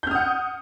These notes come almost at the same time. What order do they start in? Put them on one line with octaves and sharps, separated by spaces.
G6 F6 D#6 F#5